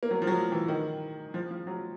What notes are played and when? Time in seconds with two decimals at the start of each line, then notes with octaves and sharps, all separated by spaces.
0.03 A#3
0.11 F#3
0.22 F3
0.27 F#3
0.52 E3
0.68 D#3
1.34 F3
1.51 F3
1.67 F#3